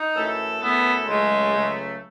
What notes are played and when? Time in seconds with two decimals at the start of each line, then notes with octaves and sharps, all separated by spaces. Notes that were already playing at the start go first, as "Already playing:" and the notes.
Already playing: D#4
0.15 F#2 E3 A3 E4 A4
0.62 F#2 E3 A3 B3 E4 A4
1.08 C#2 C#3 F#3 G#3 A3
1.54 C#2 C#3 F#3 A3